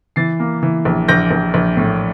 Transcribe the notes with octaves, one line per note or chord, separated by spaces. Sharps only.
E3 A6 C7
A#3
E3
A#1
A#1 G6 A#6
A#1
A#1
A2